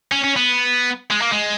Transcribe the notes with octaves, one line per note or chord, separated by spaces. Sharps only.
C#4
C#4
B3
G#3
A#3
G#3